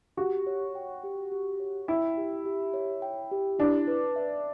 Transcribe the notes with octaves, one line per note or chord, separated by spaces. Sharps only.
F#4 G4
C#5
G5
G4
G4
C#5
E4 G5
G4
G4
C#5
G5
G4
D4 E4
B4
E5